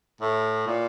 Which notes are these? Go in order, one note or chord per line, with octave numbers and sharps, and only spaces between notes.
A2
A#2